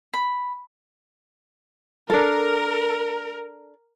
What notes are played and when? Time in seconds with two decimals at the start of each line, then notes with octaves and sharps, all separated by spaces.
0.14 B5
2.10 D4 A4 A#4